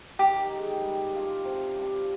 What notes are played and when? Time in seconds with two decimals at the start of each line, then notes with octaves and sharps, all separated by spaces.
0.19 D#3 G4
0.50 G#3 D#4
0.82 G3
1.14 D4 F4
1.45 C3
1.76 G3 D4 F4